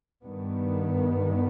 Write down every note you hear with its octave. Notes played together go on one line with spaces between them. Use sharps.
G2 D#3 B3